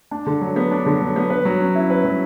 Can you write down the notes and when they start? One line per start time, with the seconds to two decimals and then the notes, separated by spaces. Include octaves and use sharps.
0.11 D4
0.26 D3
0.41 F#3
0.56 B3
0.71 D4
0.86 D3
1.01 F#3
1.16 B3
1.30 B4
1.45 F#3
1.60 C#4
1.75 E4
1.90 B4
2.05 F#3